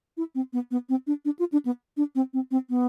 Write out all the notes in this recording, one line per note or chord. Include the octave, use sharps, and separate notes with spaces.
E4
C4
B3
B3
C4
D4
D4
F4
D4
B3
D4
C4
C4
C4
B3